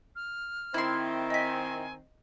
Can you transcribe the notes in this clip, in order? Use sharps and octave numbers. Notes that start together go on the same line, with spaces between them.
F6
D#3 C4 E4 C6
D#5 G#5 B6